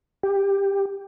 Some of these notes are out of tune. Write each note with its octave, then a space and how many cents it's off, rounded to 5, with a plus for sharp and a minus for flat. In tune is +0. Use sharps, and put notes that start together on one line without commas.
G4 +15